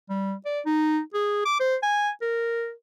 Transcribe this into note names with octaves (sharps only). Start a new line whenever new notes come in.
G3
D5
D#4
G#4
D6
C5
G#5
A#4